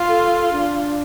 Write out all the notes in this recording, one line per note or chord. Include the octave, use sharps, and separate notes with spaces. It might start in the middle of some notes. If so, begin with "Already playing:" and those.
Already playing: F4
A4
D4